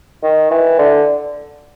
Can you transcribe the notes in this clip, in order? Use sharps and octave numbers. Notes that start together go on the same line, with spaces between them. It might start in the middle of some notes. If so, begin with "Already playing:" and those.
D#3
E3
D3